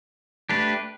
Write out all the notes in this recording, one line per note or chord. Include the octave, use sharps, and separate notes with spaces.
A3 D4 G4 B4